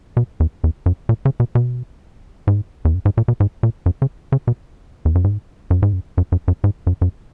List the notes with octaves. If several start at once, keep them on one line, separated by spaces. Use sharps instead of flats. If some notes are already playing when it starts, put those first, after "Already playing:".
B2
E2
E2
F#2
A#2
C#3
B2
B2
G#2
E2
F#2
G#2
A#2
B2
G#2
A#2
F#2
C#3
C#3
B2
E2
F#2
G#2
F#2
G#2
F#2
F#2
F#2
F#2
G#2
F#2
F#2